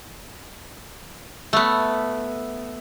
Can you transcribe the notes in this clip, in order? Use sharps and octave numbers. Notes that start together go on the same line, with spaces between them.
A3 B3